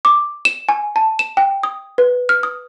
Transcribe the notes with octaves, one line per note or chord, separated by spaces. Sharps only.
D6
E7
G#5
A5
E7
G5
D#6
B4
F6
D#6